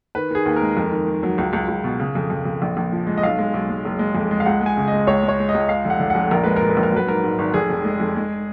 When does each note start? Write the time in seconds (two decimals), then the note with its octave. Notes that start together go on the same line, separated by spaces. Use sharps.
0.15 D#3 B4
0.31 D#3 G#4
0.45 D#2
0.56 A#4
0.62 G#3
0.77 F2
0.92 D#3
1.07 D#3
1.23 F#3
1.38 C#2
1.53 C#2
1.68 C#2
1.84 B2
2.00 C#3
2.15 F2
2.30 F2
2.45 F2
2.62 A#1
2.77 A#1
2.92 F3
3.07 G#3
3.18 D#5
3.23 B1 F5
3.39 G#3
3.54 B1
3.70 G#3
3.85 F#1
3.99 G#3
4.15 F2
4.31 G#3
4.40 F5
4.46 C#2 F#5
4.61 G#3
4.66 G#5
4.77 C#3
4.88 D#5
4.93 G#3
5.07 C#2 C#5
5.23 G#3
5.28 C#5
5.39 G#3
5.49 D#5
5.54 C#2
5.69 G#3 F5
5.85 F1 F#5
6.00 F1
6.10 F2 F#5
6.31 A#1 A#4
6.43 G#3 B4
6.56 A#2 A#4
6.70 B4
6.77 A#1
6.83 A#4
6.92 F#3 B4
7.07 G#2 A#4
7.23 G#2
7.39 G#1
7.54 F1 G#4
7.70 F2
7.84 G#3
8.00 F2
8.16 G#3